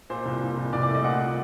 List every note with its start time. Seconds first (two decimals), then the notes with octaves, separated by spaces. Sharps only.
0.10 A#2 C5
0.26 C2
0.42 A#2
0.58 C2
0.73 C2 D5
0.83 D5
0.88 A3
0.95 D#5
1.04 A#2 F#5
1.20 A#2